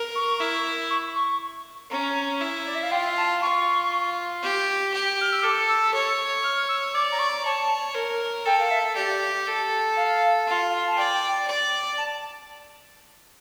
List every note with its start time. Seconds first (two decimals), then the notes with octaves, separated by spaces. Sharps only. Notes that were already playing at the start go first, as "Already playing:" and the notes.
Already playing: A#4
0.15 C#6
0.40 E4
0.90 C#6
1.15 C#6
1.91 C#4 A#5
2.41 E4
2.66 D5
2.75 E5
2.83 F5
2.91 F4 G5
3.18 A5
3.42 F4 C#6
4.43 G4
4.93 G4
5.21 F6
5.32 E6
5.43 A4 D6
5.69 E6
5.94 C#5
6.44 F6
6.69 E6
6.94 D5 D6
7.12 A#5
7.19 C#6
7.45 C#5 A5
7.95 A#4
8.46 A4 G5
8.60 F5
8.71 E5
8.96 G4 D5
9.47 A4
9.97 F5
10.47 F4
10.88 A5
10.97 D5 G5
11.47 D5
11.98 A5